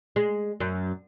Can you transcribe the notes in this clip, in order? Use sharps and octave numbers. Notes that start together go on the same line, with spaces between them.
G#3
F#2